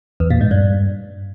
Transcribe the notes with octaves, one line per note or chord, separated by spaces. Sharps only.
E2
A#2
G#2
G2